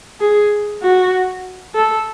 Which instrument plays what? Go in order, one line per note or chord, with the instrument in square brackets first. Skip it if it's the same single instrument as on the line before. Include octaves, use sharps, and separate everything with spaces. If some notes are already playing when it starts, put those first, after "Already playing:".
[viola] G#4
F#4
A4